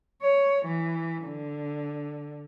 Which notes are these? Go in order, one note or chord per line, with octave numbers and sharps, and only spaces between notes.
C#5
E3
D3